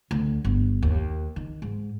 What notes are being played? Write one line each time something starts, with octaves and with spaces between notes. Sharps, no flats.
D2
G1
D#2
D#3
G#2